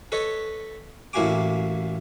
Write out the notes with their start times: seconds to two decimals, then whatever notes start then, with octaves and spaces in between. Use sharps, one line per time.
0.12 A4 B4 C#5 D#5
1.13 A1 A2 A#3 F#4 G#5 D6